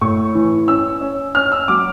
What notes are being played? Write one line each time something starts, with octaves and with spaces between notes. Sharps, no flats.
A2 C#6
E3
C#4 E6
C#4
C#4 F6
E6
F#3 D6